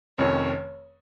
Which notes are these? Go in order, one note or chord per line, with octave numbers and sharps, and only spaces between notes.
F1 F2 D#3 C#4 C#5